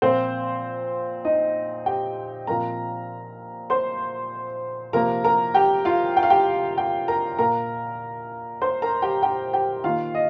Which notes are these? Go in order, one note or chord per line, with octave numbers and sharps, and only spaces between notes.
A#2 F3 A#3 C4 C5
D#4 D#5
G4 G5
A#2 F3 C4 A#4 A#5
C5 C6
C3 F3 A#3 A#4 A#5
A#4 A#5
G4 G5
F4 F5
G5
F5
G4 G5
G4 G5
A#4 A#5
A#2 A#3 A#4 A#5
C5 C6
A#4 A#5
G4 G5
G4 G5
G4 G5
D#3 A#3 F4 F5
D#5